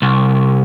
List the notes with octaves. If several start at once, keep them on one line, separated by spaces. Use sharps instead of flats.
C2